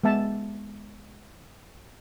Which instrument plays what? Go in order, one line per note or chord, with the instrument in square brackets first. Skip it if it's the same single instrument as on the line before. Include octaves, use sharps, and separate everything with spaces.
[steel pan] G#3 B3 E5 A5